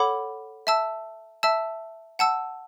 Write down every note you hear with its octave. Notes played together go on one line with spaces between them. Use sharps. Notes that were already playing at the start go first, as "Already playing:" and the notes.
Already playing: A4 C#5 F#5 B5 D6
E5 A5 E6
E5 A5 E6
F#5 A5 E6